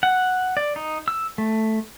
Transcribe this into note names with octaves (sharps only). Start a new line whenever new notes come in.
F#5
D5
D#4
E6
A3